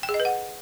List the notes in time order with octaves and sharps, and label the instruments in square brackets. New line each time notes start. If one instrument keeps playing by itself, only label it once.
[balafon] G5
G#4
D#5
B4
F#5